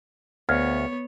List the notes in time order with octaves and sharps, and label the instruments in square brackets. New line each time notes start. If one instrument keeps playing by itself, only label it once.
[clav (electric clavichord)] D2 [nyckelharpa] B3 C#5 [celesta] F5 F6 G#6